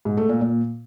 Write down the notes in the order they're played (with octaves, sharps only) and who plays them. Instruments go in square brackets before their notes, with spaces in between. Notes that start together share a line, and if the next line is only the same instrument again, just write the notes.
[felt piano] G#2
A3
A#2
A#2